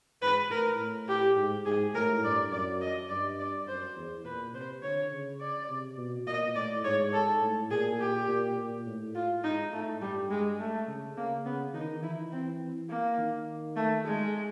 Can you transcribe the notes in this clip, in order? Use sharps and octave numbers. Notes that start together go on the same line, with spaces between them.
G#2 B4
A2 A#4
A2
G4
G#2
G#2 G#4
A2 A#4
G2 D5
F#2 D5
D#5
G2 D5
D5
F#2 C5
E2
A#2 B4
C3 C5
D3 C#5
C#3
D5
C3
B2
A#2 D#5
A2 D5
G#2 C#5
A4
A2
A#2 G#4
G4
A#2
A#2
A2
F4
G#2 D#4
A2 A3
G2 G3
G#3
A3
C#3
C#3 A#3
C#3 B3
D#3 D#4
E3 E4
C4
A#3
D#3
A3
G#3